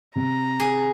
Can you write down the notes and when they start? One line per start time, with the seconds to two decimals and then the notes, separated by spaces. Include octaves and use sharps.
0.16 C3 A#5
0.60 G#4